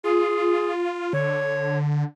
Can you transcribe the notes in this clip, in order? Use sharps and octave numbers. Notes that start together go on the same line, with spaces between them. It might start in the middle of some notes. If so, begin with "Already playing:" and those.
F4 G#4
D3 C#5